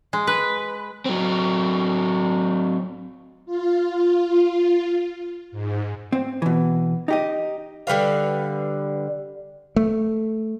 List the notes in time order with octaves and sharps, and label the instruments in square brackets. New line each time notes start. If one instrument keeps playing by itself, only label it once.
[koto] G#3
B4
[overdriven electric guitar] F#3 C4
[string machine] F4
G#2
[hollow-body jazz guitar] C4
B2 E3
D#4 G4 D#5
[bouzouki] D3 G3 B4 F5
[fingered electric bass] A3